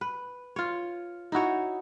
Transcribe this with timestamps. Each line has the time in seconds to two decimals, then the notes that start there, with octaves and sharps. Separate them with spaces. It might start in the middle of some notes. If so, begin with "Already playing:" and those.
0.01 B4
0.56 F4 C#5
1.32 D#4 E4 F#4 C#5